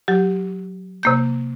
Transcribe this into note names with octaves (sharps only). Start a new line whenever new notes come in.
F#3 G4
C3 A#3 G6